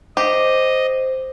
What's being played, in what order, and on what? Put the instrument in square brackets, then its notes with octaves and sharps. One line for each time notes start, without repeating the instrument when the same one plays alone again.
[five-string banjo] G4 [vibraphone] C5 [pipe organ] D#5